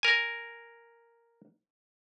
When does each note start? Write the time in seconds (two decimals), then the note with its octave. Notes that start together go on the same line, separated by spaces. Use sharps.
0.03 A#4 G#5